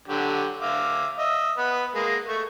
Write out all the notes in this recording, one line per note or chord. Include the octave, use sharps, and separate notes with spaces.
D3 F#3 G4
E5 F5 D6
D#5 E5
B3 B4
G#3 A#3
A3 C#6